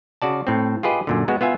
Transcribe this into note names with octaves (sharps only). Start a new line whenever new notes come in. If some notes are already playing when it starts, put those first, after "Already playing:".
C#3 F#4 D5 A5
A2 C4
F4 G4 G#4 B4 D#5
F#2 A#2 D3
G#3 B3 F#4
B3 F4 E5 G#5